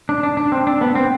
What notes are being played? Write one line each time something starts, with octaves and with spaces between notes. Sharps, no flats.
D4
D4
D4
C4
D4
B3
C4